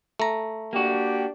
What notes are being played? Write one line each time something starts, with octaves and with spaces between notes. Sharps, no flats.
A3 A#5
A#3 D4 F#4 G4